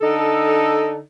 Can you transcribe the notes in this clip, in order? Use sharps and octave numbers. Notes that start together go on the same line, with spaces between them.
D3 D#4 A4